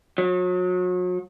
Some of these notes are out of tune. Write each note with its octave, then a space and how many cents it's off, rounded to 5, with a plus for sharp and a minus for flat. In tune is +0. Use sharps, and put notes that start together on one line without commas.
F#3 -35